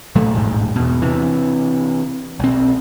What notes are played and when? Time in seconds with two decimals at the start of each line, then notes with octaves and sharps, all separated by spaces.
0.15 A#1 A#2 F#3 A3
0.33 E1 A1 G#2
0.76 E2 B2
1.02 C3 E3
2.40 B1 C4